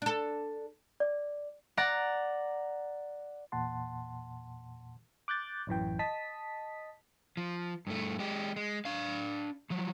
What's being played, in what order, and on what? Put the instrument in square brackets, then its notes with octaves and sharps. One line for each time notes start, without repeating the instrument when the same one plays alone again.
[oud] D4 A4
[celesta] D5
[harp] D5 F#5 A#5
[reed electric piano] E2 A#2 F#5 A5 C6
[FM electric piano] D6 F#6 G6 A6
A1 F#2 E3 G5
D#5 A5 D#6 B6
[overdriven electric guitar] F3
G2 A3
G#3 G4
G#3
D4 F5
F3 F#3